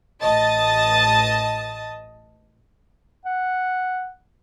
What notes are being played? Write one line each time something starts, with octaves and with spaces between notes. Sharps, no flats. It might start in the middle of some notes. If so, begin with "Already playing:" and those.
A1 D#5 A5 D#6 A6
F#5